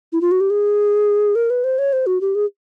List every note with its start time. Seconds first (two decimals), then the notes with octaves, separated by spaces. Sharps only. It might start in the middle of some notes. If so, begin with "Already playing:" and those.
0.13 E4
0.21 F4
0.31 F#4
0.40 G4
0.50 G#4
1.35 A#4
1.50 B4
1.64 C5
1.79 C#5
1.93 C5
2.07 F#4
2.21 G4
2.35 G#4